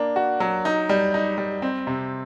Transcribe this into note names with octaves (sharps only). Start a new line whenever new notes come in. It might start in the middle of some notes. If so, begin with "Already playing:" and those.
Already playing: A#3 D4
F#4
F#3
D#4
G3
D#4
G3
C4
C3